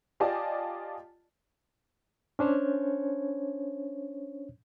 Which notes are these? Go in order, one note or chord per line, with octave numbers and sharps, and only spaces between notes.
F4 G4 D5 D#5 G#5 A5
C#4 D4 C5 C#5